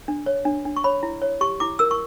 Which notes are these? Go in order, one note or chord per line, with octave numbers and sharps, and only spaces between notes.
D4
C#5
D4
D4
C#6
C#5 B5
E4
C#5
G4 C#6
E4 D6
A#4 E6
C#6